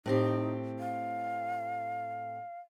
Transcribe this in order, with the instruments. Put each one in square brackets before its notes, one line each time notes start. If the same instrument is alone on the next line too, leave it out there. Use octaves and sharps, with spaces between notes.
[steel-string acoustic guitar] A2 C4 G4 [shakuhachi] D#4
[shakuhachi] F5